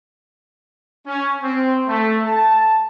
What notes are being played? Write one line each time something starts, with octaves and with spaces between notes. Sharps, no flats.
C#4
C4
A3
A5